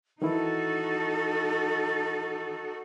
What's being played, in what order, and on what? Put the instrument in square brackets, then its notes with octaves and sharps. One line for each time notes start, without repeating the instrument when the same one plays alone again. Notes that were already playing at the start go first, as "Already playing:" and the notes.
[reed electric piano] D#3 E3 E4 [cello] D#4 F#4 [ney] A4